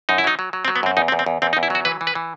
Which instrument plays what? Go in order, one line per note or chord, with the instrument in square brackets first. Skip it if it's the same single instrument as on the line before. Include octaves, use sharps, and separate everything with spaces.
[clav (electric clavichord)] F#2 D#4
E4
F#3 D#4
F#3
F#3
C4
F#3
B3
F#2 C4
E2 D#4
C4
E2
C4
E2
E2 C4
D#4
E2
E4
F#3 F#4
E3 B4
E3
B4
E3